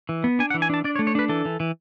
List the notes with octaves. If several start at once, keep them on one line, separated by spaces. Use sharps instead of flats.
E3
B3
D4 G#5
F#5
E3
G#5
D4 A5
D4 D5
C#5
A3
C#5
D4 B4
E3 A4
E3
E3